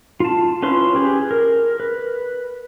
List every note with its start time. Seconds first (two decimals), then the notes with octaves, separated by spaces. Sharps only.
0.20 F4 A5
0.62 C#4 E4 F4 B4 C6
0.95 G4 G#4 B4
1.31 A#4
1.80 B4